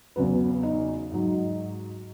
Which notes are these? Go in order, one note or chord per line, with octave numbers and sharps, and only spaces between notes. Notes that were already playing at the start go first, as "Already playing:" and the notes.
E2 C#3 F#3 B4
D#4
G#2 F#3